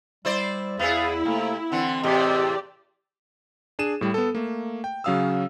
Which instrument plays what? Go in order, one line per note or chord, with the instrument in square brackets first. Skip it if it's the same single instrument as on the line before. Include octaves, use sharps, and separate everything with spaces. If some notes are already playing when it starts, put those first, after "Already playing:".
[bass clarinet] G3 [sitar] E4 C5 D5
[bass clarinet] E2 [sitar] B3 G#4 [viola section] E4 [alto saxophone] F5
[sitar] C3 [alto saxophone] A3 [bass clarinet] A#3
[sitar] D3 E3 [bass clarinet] C4 [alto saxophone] F#5
[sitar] E2 A2 C3 [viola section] G4 D5 [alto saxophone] D#5
[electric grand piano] D4 G#4 D#7 E7
A2 G3
B3 A4
A3 A#3
G5
C#3 F#3 C#4 F5 D#6 E6